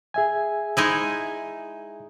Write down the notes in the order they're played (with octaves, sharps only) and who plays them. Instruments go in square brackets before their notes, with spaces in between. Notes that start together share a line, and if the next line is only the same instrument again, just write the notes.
[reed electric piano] G#4 E5 G#5
[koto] G#3 D#4 E4